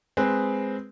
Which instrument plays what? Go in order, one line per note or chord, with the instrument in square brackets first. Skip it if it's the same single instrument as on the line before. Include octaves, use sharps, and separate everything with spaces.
[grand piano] G#3 C4 G#4 B4